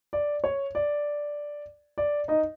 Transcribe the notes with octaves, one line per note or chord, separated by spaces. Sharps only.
D5
C#5
D5
D5
D#4 D#5